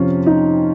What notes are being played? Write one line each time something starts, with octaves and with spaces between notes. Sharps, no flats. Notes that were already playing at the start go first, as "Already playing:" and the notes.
Already playing: F2 C3 F3 C#4 F4
D#4